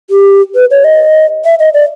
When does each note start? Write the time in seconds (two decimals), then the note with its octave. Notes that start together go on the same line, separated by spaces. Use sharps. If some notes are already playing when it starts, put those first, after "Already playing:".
0.10 G4
0.55 B4
0.71 C#5
0.84 D#5
1.45 E5
1.59 D#5
1.74 D5